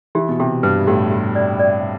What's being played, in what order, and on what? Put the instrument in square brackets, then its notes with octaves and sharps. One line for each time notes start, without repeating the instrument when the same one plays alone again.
[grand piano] E3 [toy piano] G4
[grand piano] B2
[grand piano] C3 [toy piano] G4
[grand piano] G2 [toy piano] B4
[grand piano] A2 [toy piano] G4
[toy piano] G4
D5
D5